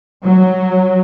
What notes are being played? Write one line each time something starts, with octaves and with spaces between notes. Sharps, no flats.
F#3